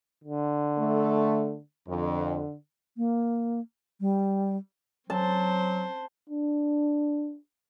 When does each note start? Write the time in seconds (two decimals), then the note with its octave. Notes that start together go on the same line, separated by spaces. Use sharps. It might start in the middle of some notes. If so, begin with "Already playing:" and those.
0.24 D3
0.78 A3
1.88 F2 D3
2.97 A#3
4.01 G3
5.10 F#3 C4 C5 A5
6.30 D4